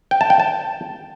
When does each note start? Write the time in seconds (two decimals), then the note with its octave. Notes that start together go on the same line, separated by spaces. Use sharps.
0.11 G5
0.21 A5
0.30 G5
0.40 A5